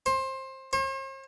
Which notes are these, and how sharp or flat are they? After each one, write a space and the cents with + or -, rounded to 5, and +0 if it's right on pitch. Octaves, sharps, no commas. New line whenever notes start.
C5 +20
C5 +45